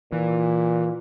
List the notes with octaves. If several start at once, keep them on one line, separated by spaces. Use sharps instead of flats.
A#2 E3